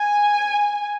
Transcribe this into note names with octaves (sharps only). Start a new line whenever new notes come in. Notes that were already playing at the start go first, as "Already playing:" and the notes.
Already playing: G#5